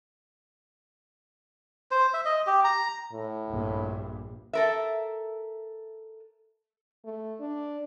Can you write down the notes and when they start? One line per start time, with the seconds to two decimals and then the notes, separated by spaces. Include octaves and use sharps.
1.91 C5
2.14 E5
2.25 D#5
2.47 G4
2.64 A#5
3.12 A2
3.49 A#1 G2
4.53 A4 A#4 E5
7.05 A3
7.40 D4